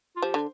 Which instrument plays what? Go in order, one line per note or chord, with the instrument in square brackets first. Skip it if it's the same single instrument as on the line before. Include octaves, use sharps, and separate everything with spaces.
[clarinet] F4
[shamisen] F3 [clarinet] G4
[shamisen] D3